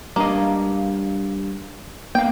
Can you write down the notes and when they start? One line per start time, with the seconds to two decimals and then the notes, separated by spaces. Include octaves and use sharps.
0.16 G3 A#3 D4 D#5 F5
2.15 A#3 B3 F5 G5